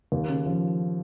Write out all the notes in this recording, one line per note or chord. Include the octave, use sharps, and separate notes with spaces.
D#2
C#3
F3